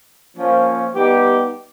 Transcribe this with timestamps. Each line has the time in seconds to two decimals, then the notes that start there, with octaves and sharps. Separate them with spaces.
0.36 F3 A#3 C#4
0.94 G3 B3 D#4 G4